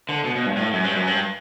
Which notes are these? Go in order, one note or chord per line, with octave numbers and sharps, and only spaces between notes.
D3
B2
B2
G2
A2
F#2
G2
F#2
G2